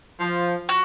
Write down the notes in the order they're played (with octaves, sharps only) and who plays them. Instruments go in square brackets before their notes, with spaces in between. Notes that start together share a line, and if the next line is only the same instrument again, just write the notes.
[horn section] F3
[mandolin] F#4